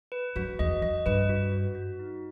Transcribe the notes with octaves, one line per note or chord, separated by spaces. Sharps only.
B4
F#2 F#4
E2 D#5
F#2 D#5
G2 B4
F#4
F#4
F#4
D#4